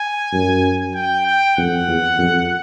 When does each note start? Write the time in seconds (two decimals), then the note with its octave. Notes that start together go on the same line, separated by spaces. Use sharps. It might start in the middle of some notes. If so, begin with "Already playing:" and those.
Already playing: G#5
0.33 F#2
0.94 G5
1.26 G5
1.57 F2 F#5
1.88 E2
2.19 F2